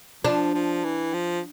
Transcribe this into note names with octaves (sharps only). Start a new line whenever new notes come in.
F3 D4
F3
E3
F3